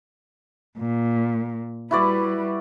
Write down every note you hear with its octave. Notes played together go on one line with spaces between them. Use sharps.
A#2
G3 E4 F#4 B4 D5